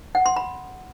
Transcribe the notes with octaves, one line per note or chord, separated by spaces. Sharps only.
F#5
C6
B5